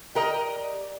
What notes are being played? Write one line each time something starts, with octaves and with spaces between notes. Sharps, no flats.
G4 A#4 D5 D#5